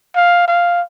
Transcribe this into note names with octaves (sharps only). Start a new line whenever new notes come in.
F5
F5